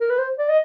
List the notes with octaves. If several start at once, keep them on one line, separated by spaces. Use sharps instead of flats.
A#4
B4
C5
D5
D#5